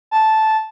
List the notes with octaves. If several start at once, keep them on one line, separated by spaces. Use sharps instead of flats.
A5